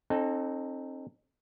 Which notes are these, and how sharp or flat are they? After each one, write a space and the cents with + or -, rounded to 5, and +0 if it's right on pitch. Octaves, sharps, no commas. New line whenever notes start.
C4 +35 D#4 -20 A4 +0